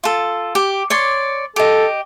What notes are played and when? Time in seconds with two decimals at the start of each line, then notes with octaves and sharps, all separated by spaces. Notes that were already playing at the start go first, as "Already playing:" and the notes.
0.04 F4 A4
0.55 G4
0.90 C#5 D5 C6
1.56 G4 A4 D#5